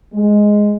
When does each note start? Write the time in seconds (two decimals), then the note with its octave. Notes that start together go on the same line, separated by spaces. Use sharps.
0.14 G#3